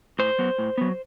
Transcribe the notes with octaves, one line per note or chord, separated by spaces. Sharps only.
A2 C5
F#3 B3
A2
F#3 B3